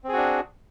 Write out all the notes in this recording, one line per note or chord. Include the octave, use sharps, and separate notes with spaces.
C4 D4 F#4 G#4